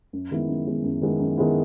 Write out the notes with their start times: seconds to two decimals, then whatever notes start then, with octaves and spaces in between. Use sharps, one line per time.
0.13 F#2
0.31 D#3 G#3 B3 E4
0.48 F#2
0.67 D#3 G#3 B3 E4
0.84 F#2
1.02 D#3 G#3 B3 E4
1.19 F#2
1.38 D#3 G#3 B3 E4